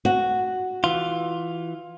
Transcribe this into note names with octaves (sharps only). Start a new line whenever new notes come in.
F#4
E3 F4